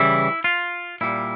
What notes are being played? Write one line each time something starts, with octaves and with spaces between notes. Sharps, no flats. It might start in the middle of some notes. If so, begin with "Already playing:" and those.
Already playing: C#3 E3 G3 E4
F4
A#2 G3 E4